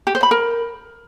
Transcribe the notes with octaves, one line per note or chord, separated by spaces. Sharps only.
G4
C5
B5
A#4